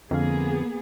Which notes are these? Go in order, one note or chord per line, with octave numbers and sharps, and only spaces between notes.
F2 D3 A#3 B3 G#4 F5